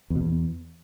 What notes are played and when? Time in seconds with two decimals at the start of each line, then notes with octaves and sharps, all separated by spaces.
0.10 E2
0.15 B2
0.21 E2